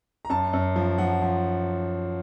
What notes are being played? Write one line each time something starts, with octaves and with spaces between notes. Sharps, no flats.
A#5
F#2 A5
F#2
F3
F3 F#5
F3